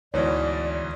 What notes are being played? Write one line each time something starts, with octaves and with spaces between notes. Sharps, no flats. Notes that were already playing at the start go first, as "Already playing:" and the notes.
D2 G#2 B2 E3 C#5 D5